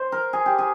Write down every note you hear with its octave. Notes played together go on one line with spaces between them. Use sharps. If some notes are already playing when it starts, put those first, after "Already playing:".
Already playing: C5
A#4
G#4
G4
G#4